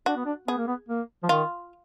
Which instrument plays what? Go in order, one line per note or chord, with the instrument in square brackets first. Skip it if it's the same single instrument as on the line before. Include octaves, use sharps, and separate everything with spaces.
[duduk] D4 [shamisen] F#4
[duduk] B3
D4
[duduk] B3 [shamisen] G#4
[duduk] A#3
B3
A#3
F3
[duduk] D#3 [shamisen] F4